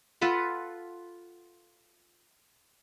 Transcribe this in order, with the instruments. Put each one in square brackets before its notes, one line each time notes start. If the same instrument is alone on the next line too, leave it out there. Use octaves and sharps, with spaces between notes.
[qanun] F4 A4 B4 F#5